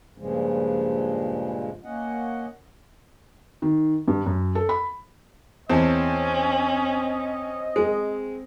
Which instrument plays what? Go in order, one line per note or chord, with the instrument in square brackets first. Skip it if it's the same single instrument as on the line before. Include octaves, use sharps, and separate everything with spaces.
[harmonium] G2 A#2 C#3 F3 G#3
A#3 C#4 D#5 F#5
[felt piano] D#3
G2
F#2
A4
B5
[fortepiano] E2 [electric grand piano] C4 A5 [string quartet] C#4 [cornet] D#5
[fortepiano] G#3